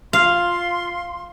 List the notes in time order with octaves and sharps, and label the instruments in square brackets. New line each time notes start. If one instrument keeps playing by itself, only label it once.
[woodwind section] F4 C6 [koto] F5